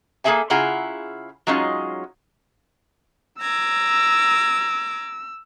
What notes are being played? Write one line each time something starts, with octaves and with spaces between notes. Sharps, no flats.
A#3 C#4 G#4 A4 E5 G#5
C#3 E4 F4 G#4 F#5 A#5
F#3 G#3 C#4 D#4 F4
A#5 D6 E6 G#6